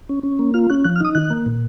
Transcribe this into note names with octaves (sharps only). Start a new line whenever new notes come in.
C#4
C#4
A#3
F4 F6
C#4 F#6
F3 F#6
F6
D#4 D#6
D#3 F#6
A#3
A#2